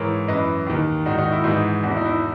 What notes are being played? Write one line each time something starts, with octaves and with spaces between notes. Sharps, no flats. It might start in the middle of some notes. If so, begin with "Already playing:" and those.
Already playing: G#2 E3 A#4 C#5
F#2 E3 B4 D#5
D#2 D#3
G#2 D#3 D#4 F#4
D#4 F#4
E4
G#2 E3 D#4 F#4
E2 B2 E4 F#4
D#4
E4